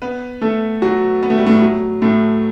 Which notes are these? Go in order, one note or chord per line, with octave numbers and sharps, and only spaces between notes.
B3 B4
A3 A4
F#3 F#4
B3
A3
G3
A2 A3
F#3
A2 A3